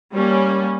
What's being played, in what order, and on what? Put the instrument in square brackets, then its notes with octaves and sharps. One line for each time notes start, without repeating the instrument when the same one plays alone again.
[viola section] G3 A#3 C#4